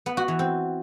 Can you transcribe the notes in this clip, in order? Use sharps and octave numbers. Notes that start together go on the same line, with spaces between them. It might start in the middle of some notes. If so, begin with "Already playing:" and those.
B3
F#4
E3
C4